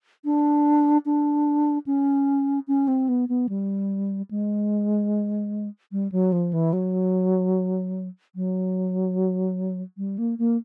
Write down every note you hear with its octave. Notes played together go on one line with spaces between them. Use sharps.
D4
D4
C#4
C#4
C4
B3
B3
G3
G#3
G3
F#3
F3
E3
F#3
F#3
G3
A#3
A#3